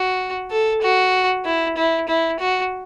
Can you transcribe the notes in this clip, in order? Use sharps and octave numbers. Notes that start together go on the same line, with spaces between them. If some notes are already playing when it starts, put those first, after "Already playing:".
Already playing: F#4
A4
F#4
E4
E4
E4
F#4